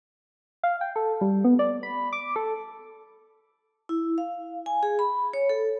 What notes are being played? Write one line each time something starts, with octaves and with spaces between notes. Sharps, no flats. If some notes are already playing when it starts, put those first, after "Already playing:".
F5
G5
A4
G3
B3
D5
B5
D6
A4
E4
F5
G#5
G#4
B5
C#5
A4